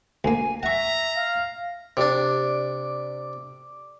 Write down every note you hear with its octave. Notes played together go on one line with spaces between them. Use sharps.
D2 A#3 G#5
E5 F#5 A#5 C#6
F5
C3 D4 D5